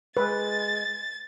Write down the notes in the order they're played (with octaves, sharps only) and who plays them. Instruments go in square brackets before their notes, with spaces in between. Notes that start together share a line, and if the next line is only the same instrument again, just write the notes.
[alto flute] G#3 [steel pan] B4 [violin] A6